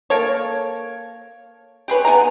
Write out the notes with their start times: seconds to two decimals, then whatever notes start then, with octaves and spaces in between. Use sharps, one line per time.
0.10 A#3 A4 C#5
1.88 G4 G#4 B4 C#5
2.05 B3 G4 G#5 A#5